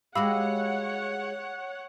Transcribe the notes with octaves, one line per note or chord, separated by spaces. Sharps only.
G#3 F#4 G4 C#5 F5 F#5 B5 E6